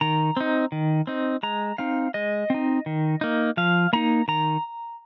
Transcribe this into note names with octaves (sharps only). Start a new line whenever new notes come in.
D#3 A#5
C4 D#4
D#3
C4 D#4
G#3 A#5
C4 D#4 F5
G#3 D#5
C4 D#4
D#3
A#3 D#4
F3 F5
A#3 D#4 A#5
D#3 A#5